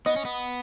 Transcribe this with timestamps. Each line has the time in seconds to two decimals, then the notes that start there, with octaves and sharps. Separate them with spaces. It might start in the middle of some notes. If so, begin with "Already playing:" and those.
0.06 B3 D#5
0.16 C#4
0.25 B3